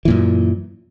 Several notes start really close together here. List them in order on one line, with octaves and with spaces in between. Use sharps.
E3 A#2 F#2